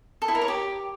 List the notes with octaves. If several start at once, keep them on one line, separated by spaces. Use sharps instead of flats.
A4
E4
A#4
C#5
G4